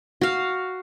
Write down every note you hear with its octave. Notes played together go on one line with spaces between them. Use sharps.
F#4 F5